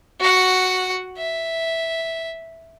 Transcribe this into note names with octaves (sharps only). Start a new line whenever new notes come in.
F#4 F#5
E5